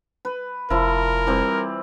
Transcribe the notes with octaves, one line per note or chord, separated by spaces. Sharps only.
B4
F1 F3 E4 A#4
E3 G3 C4